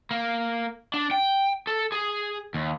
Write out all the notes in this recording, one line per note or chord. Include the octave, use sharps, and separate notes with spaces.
A#3
D4
G5
A4
G#4
D#2